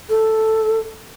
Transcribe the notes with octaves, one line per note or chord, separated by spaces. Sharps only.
A4